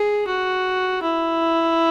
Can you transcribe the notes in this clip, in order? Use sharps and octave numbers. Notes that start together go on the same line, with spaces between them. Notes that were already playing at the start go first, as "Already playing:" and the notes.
Already playing: G#4
F#4
E4